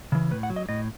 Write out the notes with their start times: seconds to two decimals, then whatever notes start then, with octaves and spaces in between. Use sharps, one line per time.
0.12 C#3 E3
0.31 A2 B4
0.43 F#5
0.50 F#3
0.56 D#5
0.69 A2 D#5